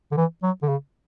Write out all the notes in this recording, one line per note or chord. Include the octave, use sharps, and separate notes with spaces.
D3
E3
F#3
D3
C#3